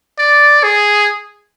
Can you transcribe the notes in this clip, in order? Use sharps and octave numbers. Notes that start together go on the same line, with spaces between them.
D5
G#4